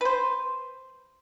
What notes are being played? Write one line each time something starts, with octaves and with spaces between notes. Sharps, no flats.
B4 C5